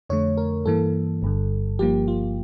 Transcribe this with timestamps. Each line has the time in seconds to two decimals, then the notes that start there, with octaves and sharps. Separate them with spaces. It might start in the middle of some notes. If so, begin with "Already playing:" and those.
0.10 F2 D3 A3 C#5
0.37 A#4
0.66 G2 E3 A#3 A4
1.22 G1 G2 D3
1.79 G1 G2 F3 A#3 G4
2.08 F4